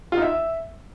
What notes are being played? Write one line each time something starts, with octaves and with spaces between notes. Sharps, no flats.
F4
D#4
E5